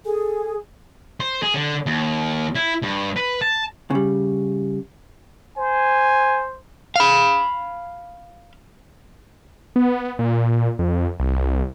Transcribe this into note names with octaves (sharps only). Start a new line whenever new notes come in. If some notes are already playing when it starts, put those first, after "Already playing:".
G#4 A4 G#5
C5
G#4
D3
D#2
E4
G2
B4
A5
C#3 G3
C5 G#5
F5 B5
B3
A#2
F2
C2